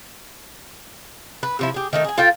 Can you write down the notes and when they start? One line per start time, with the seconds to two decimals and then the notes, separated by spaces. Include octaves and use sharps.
1.43 B4
1.59 C3 F3 E4
1.74 G4 G#4
1.93 D#3 A3 D#4
2.04 G#4 G#5
2.18 F4 A4 F5 G5